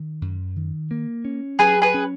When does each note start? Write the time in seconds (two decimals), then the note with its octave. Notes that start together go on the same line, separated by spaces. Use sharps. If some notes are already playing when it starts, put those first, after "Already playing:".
Already playing: D#3
0.21 F#2
0.56 D#3
0.91 A#3
1.25 C#4
1.59 F#3 G#4 B4
1.82 G#4 B4
1.94 C#4